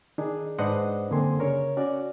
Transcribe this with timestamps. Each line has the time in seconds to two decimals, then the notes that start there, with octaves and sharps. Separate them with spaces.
0.18 D#3 D4 D#4 G#4
0.59 G#2 D4 B4 C5 D#5 F#5
1.10 F#2 D3 A#3 C4 G#5 C6
1.39 C#3 A#4 C#5
1.77 C#4 F#4 D5